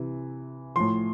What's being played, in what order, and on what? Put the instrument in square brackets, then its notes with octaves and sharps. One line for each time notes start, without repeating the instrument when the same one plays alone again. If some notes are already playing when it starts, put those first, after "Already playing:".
Already playing: [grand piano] C3 E3
A2 F3 C6